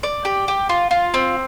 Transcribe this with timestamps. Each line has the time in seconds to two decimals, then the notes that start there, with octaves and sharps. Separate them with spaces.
0.03 D5
0.25 G4
0.48 G4
0.69 F4
0.91 F4
1.14 C4